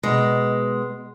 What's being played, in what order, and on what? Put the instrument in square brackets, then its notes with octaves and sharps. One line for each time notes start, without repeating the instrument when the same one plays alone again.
[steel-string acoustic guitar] B2 G#3